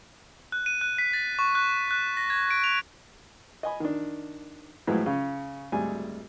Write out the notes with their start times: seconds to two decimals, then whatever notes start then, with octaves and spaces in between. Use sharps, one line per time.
0.52 F#6
0.66 D#7
0.81 F#6
0.98 B6
1.13 A6
1.39 C#6
1.55 F#6
1.91 F#6
2.17 A#6
2.30 G#6
2.51 D7
2.64 F7
3.63 D#5 G#5 B5
3.80 D#3 D4
4.87 A2 F3 F#3 G#3 B3 E4
5.06 C#3 C#4
5.72 G#1 D2 G3 G#5